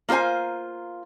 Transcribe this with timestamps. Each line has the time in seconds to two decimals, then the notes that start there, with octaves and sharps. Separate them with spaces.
0.09 A#3 F4 A4 C5 G#5